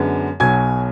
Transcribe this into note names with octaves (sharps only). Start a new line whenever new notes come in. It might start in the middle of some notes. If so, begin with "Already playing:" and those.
Already playing: F#2 D3 G#3 B3
B1 B2 F#3 G#5 G#6